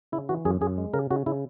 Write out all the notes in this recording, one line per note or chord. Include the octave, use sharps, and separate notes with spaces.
C#3 E4
E3 F#4
F#2 G#4
F#2 G#4
G#3
C#3 A#4
C#3 F#4
C#3 E4